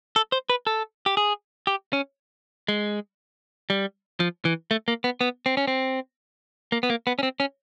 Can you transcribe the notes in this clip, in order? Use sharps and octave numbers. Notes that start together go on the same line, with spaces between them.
A4
C5
B4
A4
G4
G#4
G4
C#4
G#3
G3
F3
E3
A3
A#3
B3
B3
C4
C#4
C4
A#3
B3
A#3
B3
C#4
C4
C#4